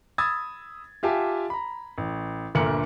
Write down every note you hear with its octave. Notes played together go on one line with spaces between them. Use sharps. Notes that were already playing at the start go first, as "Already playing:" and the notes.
B5 D#6 E6 G#6 A6
F4 G4 E5 G#5 A5
A#5 B5
A1
G1 D2 A#2 A#4 C#7 F#7